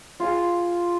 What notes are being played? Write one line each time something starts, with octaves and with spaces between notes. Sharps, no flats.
F4 G#4